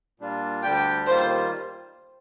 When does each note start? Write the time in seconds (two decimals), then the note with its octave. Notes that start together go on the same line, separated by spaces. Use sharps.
0.20 A#2 G3 D4 F4
0.63 D2 D3 G3 D4 G4 G5
1.07 D#2 D#3 G3 A#3 F4 C5